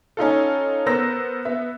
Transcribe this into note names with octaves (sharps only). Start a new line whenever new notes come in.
C#4 D#4 F4 A4
B3 A#4 C5 E6 A#6
B3 E5